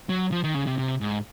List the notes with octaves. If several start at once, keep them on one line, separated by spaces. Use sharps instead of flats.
F#3
F3
D#3
C#3
C3
C3
G#2